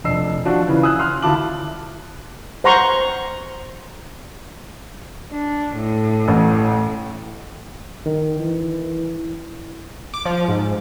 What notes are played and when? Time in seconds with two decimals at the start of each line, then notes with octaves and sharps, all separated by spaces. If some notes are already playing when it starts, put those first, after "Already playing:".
0.04 F1 D4 D#5 E6 C7
0.45 F3 D4 F4 F#4
0.67 C#3 E3
0.83 G#5 D#6 E6 F#6
0.99 C6 F6 F#6
1.22 D2 E4 F4 A5 D6 F#7
2.64 C5 F#5 A#5 C6 C#6
5.32 D4
5.76 A2
6.28 A1
8.06 D#3
8.39 E3
10.14 D6
10.25 F3
10.48 G#2